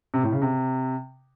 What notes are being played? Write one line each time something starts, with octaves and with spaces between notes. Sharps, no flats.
C3
A2
C#3
C3